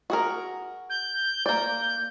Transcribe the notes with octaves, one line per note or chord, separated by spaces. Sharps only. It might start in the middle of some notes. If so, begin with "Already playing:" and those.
F#4 G#4 A#4
G6
A#3 D5